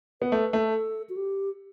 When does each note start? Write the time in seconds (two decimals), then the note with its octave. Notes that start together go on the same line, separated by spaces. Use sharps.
0.22 B3 B4
0.32 A3
0.53 A3
0.69 A4
1.09 F#4
1.17 G4